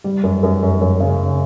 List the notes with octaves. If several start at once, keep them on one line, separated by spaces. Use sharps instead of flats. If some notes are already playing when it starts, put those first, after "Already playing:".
G3
F#2
F#2
F#2
F#2
C#3